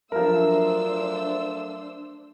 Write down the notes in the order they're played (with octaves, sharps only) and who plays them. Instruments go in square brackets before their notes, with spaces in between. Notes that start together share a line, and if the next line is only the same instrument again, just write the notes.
[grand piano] F3 A#4 [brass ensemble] F#3 A3 E5 [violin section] D4 C5 E6